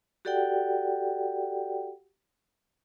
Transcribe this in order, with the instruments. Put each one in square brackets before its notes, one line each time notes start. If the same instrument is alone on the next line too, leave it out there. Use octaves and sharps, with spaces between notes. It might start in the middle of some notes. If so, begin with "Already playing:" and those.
[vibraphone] F#4 G4 A4 D5 F#5 G5